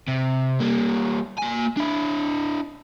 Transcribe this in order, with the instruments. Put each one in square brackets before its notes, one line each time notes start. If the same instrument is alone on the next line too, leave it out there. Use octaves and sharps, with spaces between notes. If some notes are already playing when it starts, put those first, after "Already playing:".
[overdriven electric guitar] C3
G3 A#3
A#3 G#5
D4 E4